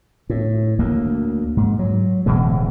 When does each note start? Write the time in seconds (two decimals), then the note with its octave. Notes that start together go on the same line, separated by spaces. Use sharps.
0.30 A2
0.79 D2 A#3
1.57 G#2
1.79 F#3
2.26 D1 B2 E3 G#3